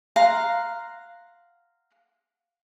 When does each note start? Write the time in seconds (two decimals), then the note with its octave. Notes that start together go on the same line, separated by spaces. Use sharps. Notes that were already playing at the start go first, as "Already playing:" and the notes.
0.16 F5 F#5 A#5 C6